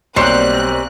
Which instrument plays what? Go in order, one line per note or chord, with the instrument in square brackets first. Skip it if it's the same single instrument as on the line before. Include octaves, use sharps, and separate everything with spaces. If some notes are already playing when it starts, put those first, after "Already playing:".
[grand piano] B1 [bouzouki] G3 [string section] A#3 C4 F#6 [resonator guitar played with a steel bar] G4 C5 C#5